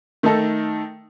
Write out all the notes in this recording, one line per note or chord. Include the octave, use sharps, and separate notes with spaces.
D#3 A3 D#4 A4